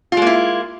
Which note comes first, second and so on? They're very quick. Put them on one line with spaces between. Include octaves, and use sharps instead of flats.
F4 G#3 A#3 E4